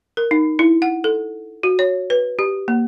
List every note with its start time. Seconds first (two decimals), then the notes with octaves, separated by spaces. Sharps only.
0.17 A#4
0.31 D#4
0.59 E4
0.82 F#5
1.04 A4
1.63 F#4
1.79 C#5
2.10 B4
2.39 G4
2.68 A#3